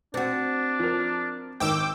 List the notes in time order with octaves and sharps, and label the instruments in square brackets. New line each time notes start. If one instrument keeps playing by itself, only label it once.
[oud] C4 F#4 [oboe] D4
[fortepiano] F3 A#4
[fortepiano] G#1 D#3 A#4 [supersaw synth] G5 D6 E6